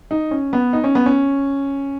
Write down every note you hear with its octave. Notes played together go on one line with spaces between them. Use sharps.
D#4
C#4
B3
D#4
C#4
B3
C#4